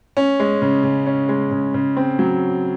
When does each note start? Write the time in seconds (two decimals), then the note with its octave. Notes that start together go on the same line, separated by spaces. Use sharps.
0.17 C#4
0.40 G#3
0.62 C#3
0.84 C#3
1.06 C#4
1.29 G#3
1.51 C#3
1.74 C#3
1.97 C4
2.19 F#3